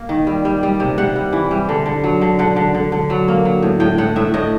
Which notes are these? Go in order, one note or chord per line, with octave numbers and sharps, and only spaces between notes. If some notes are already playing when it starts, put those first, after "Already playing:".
Already playing: A#3
D#3
G3
G3
G3
C3
C3 F#5
G3
E3
G3
D3
D3
F#3
D3
D3 F#5
D3
D3
D3
F#3
A#3
F#3
A2
A2 G5
A2 F#5
A2 E5
A2 D#5